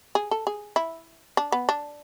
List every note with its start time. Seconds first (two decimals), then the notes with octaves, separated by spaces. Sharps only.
0.15 G#4
0.31 A4
0.47 G#4
0.76 E4
1.37 D4
1.52 B3
1.69 D4